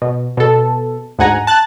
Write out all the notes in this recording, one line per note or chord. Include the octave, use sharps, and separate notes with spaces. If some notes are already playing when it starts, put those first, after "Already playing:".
B2
B2 A4
D2 G#2 F#5 G#5 A#5
A5 F#6 A6